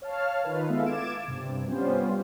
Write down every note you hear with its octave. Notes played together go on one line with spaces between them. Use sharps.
C#5 F5 A5 F6
D#3 F4 B4
G#3 B3 E4 A4 E5 F5
D6 G#6 A6 D7 E7
G2 C3
G3 B3 C#4 F4 C5